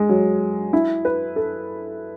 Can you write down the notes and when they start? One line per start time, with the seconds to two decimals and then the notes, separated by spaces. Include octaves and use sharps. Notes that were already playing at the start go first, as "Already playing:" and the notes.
Already playing: G#3
0.09 F#3
0.73 E4
1.05 B4
1.36 A4